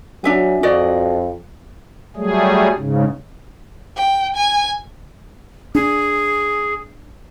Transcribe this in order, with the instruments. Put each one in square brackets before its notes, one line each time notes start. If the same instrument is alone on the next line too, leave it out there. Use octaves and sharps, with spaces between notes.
[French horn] F#3 [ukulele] D4 E5 G#5
[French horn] F2 [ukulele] F#4 D5 D#5
[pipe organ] F#3 G3 A3 G#4
G#2 C#3
[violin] G5
G#5
[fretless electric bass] D4 [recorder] G#4